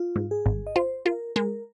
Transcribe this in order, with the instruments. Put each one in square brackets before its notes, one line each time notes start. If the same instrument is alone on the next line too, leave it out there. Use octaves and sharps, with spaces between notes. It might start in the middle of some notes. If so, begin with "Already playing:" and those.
Already playing: [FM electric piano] F4
[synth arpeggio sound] G#2
[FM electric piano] G#4
[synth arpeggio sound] G#1
[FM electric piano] D#5
[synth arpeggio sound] F4 [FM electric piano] C5
[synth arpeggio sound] F4 [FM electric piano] A#4
[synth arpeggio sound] G#3 [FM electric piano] A#4